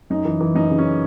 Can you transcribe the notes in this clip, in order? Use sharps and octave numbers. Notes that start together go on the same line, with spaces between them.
F#2 D#4
E3
E3
F#2 D#4
C#3
C#4